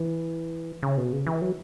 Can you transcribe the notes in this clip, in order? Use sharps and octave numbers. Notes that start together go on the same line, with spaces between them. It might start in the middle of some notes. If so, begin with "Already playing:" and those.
Already playing: E3
C#3
B2
C#3
E3
F#3